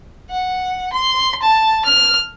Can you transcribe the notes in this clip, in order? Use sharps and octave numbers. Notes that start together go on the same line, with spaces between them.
F#5
C6
A5
F6